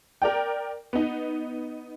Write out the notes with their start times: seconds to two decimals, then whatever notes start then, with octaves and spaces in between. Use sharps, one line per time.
0.22 A#4 D5 G5
0.93 B3 D#4